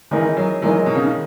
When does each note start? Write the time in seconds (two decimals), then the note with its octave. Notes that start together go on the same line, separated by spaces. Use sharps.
0.11 D#3 E3 G#3 D#4 A#4 D#5
0.37 F#3
0.62 E3 F#3 G#3 D#4 A#4 D#5
0.86 B2
0.95 C#3
1.05 D#3